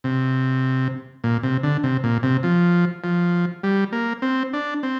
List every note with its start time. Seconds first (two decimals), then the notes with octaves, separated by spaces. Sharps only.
0.04 C3
1.24 A#2
1.43 C3
1.63 D3
1.83 C3
2.04 A#2
2.23 C3
2.43 F3
3.04 F3
3.63 G3
3.92 A#3
4.22 C4
4.53 D4
4.83 C4